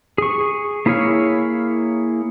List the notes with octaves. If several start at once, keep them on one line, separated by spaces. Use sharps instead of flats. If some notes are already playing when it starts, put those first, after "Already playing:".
G#4 C#6
A#3 E4 G#4 C#5 F5